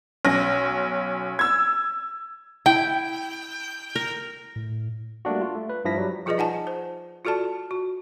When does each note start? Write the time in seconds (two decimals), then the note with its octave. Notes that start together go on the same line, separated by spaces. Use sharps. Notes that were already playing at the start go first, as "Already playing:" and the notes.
0.25 B1 C#4 A#6
1.39 E6 G#6
2.66 E4 G5
3.95 A#4
4.56 A2
5.25 G3 A3 A#3 D4 F#4
5.41 F4
5.55 A3
5.69 B4
5.85 G2 F3 E4 A#6 B6
5.97 F#3 G3
6.26 F3 F4 G#4 B4 D5 D#5
6.38 D#4 F#5 G#5 A5
6.67 C5
7.25 F4 F#4 A4 D5 A5
7.71 F#4